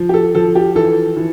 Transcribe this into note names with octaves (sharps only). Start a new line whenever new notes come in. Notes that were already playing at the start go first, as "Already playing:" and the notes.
Already playing: F3
G4
A4
F3 A4
G4
E3 A4
E3